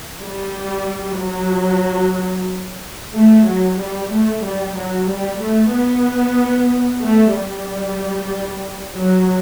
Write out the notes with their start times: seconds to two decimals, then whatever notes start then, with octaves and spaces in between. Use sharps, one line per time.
0.22 G3
1.19 F#3
3.13 A3
3.46 F#3
3.78 G3
4.11 A3
4.43 G3
4.75 F#3
5.07 G3
5.41 A3
5.73 B3
7.03 A3
7.35 G3
8.96 F#3